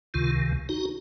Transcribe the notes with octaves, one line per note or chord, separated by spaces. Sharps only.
C#2 C3 D#3 F4
D#4 F#4